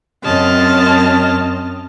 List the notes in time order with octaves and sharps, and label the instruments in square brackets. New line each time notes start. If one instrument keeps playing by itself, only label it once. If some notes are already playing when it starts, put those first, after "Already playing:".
[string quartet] F#2 C4 C#4 D#5 A5 F6